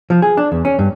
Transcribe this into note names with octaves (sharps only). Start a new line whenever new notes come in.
F3
G#4
D4
E2
C#4
G2